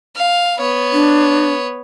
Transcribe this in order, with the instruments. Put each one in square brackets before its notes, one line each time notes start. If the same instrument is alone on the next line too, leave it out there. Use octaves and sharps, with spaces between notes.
[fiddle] F5
B3 C#5
[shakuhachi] D4